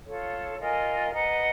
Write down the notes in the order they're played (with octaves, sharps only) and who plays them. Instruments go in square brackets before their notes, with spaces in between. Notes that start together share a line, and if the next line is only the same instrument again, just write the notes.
[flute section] F4 A4 C#5
F4 A#4 D#5 G#5
B4 D#5 F#5 A#5